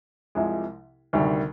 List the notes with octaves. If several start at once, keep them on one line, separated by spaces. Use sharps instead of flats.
C2 C3 F3 G#3
D2 C3 D#3 G3